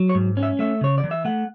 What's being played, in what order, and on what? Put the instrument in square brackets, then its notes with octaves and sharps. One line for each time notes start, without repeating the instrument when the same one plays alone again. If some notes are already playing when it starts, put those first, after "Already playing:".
Already playing: [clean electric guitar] F#3
C#5
G#2
C#4
E5
A3 E5
C#3 C#5
D5
E3
E5
A3 F#5